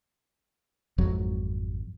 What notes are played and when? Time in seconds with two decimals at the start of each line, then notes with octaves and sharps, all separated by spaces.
0.98 G#1 F2 F#3